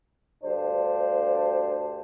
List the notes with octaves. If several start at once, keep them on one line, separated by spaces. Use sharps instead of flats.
D2 G2 D4 C5